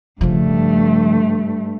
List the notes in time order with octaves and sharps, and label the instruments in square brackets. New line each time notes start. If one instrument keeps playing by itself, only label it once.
[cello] G2 A3 [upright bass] C#3 F3